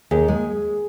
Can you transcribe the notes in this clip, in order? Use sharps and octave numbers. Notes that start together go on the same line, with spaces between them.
D#2 G#4
G#3